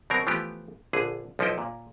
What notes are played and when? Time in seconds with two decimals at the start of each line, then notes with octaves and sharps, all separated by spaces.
0.10 B2 F#3 C4 A#4
0.27 E3 F3 A3 B3 G4
0.93 A#1 D3 G#4
1.39 B1 F3 D#4 E4 G5
1.58 A#2